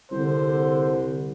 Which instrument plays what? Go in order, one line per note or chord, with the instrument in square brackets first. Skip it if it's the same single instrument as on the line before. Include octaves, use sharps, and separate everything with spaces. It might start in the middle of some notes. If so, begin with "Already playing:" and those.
[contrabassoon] C2 [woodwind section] D3 [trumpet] C5